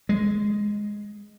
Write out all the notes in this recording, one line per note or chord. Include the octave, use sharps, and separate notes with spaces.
G#3